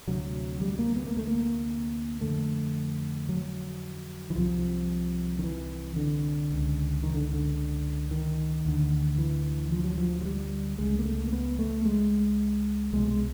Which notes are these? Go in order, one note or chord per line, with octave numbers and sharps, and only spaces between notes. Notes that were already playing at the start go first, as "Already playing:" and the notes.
D2 C3 F#3
G3
A#3
B3
A#3
A3
A#3
F2 D3 A3
F#3
E3
C2 C3 F3
D#3
E3
D3
C#2 C#3
D#3
D3
D3
D#3
D2 D3
E3
F3
F#3
F3
F#3
G3
C#2 C#3 G#3
A#3
A3
A#3
B3
A3
G#3
C2 B2 G#3
G#3